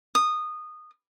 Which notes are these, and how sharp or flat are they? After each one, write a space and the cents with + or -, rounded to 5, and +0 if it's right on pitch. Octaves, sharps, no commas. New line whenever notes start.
D#6 -15